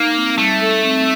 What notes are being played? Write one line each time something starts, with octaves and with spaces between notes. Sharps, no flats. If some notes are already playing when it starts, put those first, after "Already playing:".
Already playing: A#3 D#4
C4
G3 A3
A4
C4